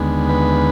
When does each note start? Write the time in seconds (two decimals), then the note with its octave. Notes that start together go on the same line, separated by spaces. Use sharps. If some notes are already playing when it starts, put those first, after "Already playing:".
Already playing: D#2 D3 G#3 B3
0.29 B4